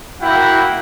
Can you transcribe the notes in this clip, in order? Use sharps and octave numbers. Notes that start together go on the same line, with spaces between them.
A#3 E4 F#4 F#5 G5